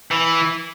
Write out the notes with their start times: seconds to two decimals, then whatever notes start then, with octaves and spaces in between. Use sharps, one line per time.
0.11 E3